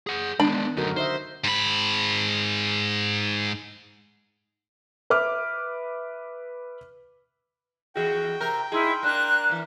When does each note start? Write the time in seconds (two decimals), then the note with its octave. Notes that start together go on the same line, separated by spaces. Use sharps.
0.07 G#4 F#5
0.40 D#3 G#3 B3 D4 B5
0.77 F#2 D3 D#4 F#4 A#4
0.97 D#4 C5 D#5 E5
1.44 G#2 B5
5.10 B4 E5 D6 F6
7.96 E2 F#4 G#4 G5
8.41 C3 A#4 G6
8.72 D#4 E4 G#4 A#5 C6 F6
9.03 A#3 D4 A#4 F#6
9.50 E3 A#3